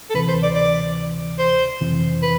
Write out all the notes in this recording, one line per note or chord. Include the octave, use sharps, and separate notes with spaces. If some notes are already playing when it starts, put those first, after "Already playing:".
A4
D2 C3 E3 B4
C5
D5
D5
C5
F2 C3 E3
B4